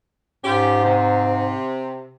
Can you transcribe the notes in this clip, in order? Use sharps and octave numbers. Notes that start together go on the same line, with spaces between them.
G#2 C#4 F4 G4
C3